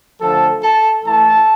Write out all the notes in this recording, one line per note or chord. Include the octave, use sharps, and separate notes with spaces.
D3 F3 A3 A4 A5
A4 A5
A2 E3 A3 A4 A5